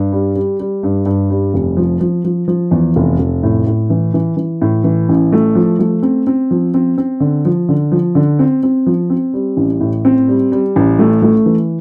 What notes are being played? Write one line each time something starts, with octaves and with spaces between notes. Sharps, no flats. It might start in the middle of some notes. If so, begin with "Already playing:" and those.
Already playing: G2
G3
G3
G3
G2
G2
G3
F1
F3
F3
F3
F3
E2
F1
F1
A2
A2
E3
E3
E3
A2
E3
A1
A3
F3
A3
C4
C4
F3
C4
C4
D3
F3
D3
F3
D3
C4
C4
F3
C4
G3
A1
A2
C4
G3
G3
A1
A3
A3
E3